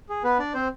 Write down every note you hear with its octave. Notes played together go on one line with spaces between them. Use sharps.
G#4
B3 B4
D4 D5
C4 C5